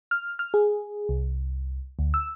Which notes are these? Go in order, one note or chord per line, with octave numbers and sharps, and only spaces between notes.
F6
F6
G#4
C2
D2
E6